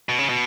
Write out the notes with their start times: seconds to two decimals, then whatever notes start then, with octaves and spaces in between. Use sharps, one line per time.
0.09 B2
0.19 C#3
0.29 B2